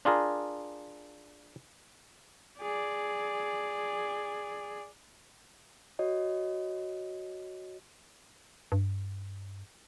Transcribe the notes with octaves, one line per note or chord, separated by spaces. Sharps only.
D4 F4 G#4 A#4
G#4 D5
F#4 C#5 D#5
G2